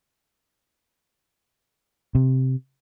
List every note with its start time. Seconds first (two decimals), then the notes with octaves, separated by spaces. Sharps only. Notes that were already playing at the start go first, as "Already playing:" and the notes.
2.15 C3